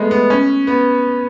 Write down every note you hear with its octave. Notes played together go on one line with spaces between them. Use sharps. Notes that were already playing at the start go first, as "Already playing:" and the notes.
Already playing: G#3 A3 B3
B3
C#4
B3